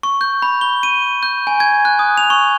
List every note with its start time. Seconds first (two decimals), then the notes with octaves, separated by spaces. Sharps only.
0.03 C#6
0.21 G6
0.42 B5
0.61 G7
0.83 D#7
1.23 G6
1.47 G#5
1.60 G#6
1.85 F#6
1.99 D#6
2.17 F7
2.30 C#6